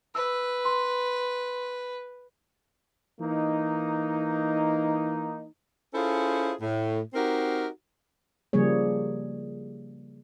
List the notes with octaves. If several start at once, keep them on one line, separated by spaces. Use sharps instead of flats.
B4 E6
C6
E3 A#3 D#4
C#4 E4 F4 G#4 A4 C5
A2
C4 D#4 F#4 G4 A#4
C#3 F3 G3 A#3 G#4 C#5